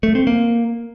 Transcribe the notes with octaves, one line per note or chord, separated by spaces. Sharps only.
A3
C4
A#3